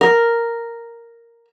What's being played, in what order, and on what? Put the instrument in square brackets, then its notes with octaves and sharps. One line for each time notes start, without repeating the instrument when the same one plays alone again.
[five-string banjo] A#4